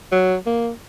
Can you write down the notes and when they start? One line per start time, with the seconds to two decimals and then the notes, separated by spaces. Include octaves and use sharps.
0.12 F#3
0.46 A#3